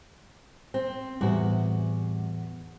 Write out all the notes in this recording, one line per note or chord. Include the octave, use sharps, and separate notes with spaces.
C4
E2 A2 G3 F#4